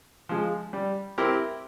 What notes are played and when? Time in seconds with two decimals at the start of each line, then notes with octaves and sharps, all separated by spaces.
0.29 F3 G#3
0.73 G3
1.18 C4 E4 G4 A#4